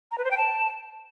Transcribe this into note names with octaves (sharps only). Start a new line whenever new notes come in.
A#5
B4
C5
G5
A5